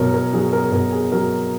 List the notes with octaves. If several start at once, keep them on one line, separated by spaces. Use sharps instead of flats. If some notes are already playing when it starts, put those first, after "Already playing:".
Already playing: B2 F#3 A#4 C#5
A#4
F#3 G#4
A#4
B2 A#4
G#4
F#3 A#4